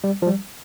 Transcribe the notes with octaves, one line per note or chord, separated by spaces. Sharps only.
G3
F3
G3